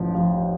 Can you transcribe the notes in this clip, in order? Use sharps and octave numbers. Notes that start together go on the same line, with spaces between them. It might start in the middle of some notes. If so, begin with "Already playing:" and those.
Already playing: A1 F3
F3